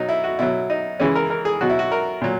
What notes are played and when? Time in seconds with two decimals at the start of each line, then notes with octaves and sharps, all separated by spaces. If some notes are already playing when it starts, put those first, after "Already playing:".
Already playing: B2 F#3 D#4
0.09 E4
0.24 F#4
0.39 B2 F#3 E4
0.70 D#4
1.00 C#3 E3 G#3 C#4
1.15 A#4
1.30 A#4
1.45 G#4
1.61 B2 F#3 F#4
1.70 E4
1.79 F#4
1.92 A#4
2.21 A#2 F#3